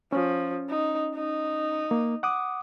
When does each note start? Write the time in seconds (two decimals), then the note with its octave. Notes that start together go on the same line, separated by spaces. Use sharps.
0.12 F3 C#4
0.69 D#4
1.15 D#4
1.91 A#3
2.23 F#5 D6 D#6